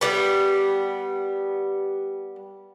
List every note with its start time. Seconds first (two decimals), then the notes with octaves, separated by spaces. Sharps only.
0.01 G3 B3